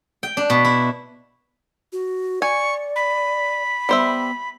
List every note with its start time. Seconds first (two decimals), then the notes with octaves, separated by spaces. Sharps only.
0.23 G5
0.37 D4
0.50 B2
0.65 E4
1.93 F#4
2.42 D5 G#5 C#6
2.96 B5
3.89 G3 B3 C5 E5